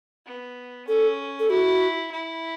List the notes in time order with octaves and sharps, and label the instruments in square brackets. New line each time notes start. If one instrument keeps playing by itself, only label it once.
[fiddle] B3
[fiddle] C#4 [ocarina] A4
[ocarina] A4
[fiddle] E4 [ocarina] F#4
[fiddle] E4